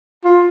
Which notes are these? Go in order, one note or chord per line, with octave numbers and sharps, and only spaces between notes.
F4